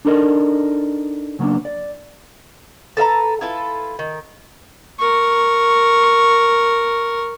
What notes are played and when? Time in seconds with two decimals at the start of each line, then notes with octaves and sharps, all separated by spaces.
0.05 D4 D#4 A4 A#4 D5 D#5
1.39 C#3 F#3 A#3 B3 D4
1.65 D5
2.97 A4 B4 E5 A#5
3.41 E4 F4 A4 B4
3.99 D#3
4.99 A#4 C#6